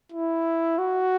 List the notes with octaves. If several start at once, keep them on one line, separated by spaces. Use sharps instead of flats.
E4
F#4